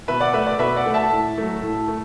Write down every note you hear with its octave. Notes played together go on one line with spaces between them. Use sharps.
B2 B4 E5
D5 F#5
A3 B4 E5
D5
B2 B4 E5
D5 F#5
A3
E5 A5
A2
F#3 A3
A2
A3